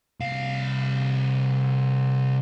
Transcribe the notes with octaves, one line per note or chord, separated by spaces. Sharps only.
C2 F5